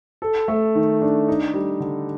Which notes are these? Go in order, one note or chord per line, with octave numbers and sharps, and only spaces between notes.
A4
A3
D#3
D4
D#4
G3
D3